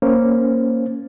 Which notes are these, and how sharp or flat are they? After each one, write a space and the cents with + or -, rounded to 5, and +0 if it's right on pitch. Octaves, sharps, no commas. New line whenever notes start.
A#3 +0 C#4 +0 C5 +0